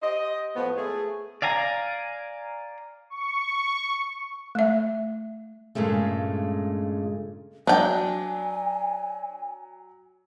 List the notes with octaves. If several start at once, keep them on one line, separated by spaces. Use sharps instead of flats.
G4 C5 D#5
A2 F3 B3
A3 G#4
D5 F5 G#5 A#5
C#6
A3 E5
G2 A#2 C#3 G#3 A3
F#3 D4 G5 G#5